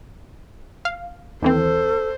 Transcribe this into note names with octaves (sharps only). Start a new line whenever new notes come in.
F5
D#2 E3 C4 A4 C5